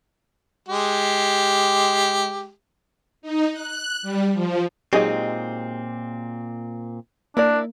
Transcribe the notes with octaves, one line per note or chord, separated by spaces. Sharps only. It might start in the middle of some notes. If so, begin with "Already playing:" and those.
G#3 G4
D#4
F#6
G3
F3
A#2 F#3 G#3 C4 D#4 G4 G#4 D#5
A#3 D4 E4 A#4 D5